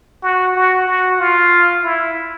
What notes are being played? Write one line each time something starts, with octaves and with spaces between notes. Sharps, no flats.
F#4
F#4
F#4
F4
E4